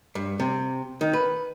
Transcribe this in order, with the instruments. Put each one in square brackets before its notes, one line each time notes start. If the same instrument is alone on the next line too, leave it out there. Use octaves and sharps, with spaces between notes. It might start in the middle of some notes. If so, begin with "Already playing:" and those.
[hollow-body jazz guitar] G2
C3
D#3
B4